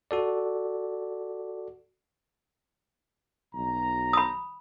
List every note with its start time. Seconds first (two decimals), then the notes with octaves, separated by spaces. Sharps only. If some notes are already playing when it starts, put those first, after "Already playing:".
0.11 F#4 A4 D5
3.55 B1 B2 A#5
4.13 B5 D#6